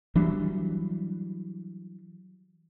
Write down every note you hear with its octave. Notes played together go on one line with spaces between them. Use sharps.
E3 F#3 G3 D4